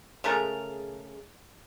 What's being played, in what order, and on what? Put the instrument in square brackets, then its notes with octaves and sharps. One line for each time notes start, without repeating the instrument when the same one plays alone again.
[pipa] C#3 G#3 A3 A#4